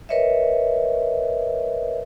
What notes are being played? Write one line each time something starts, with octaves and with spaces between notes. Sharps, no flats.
A#4 B4 C#5 D#5 E5